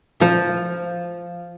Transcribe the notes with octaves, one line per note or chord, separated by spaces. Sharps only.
F3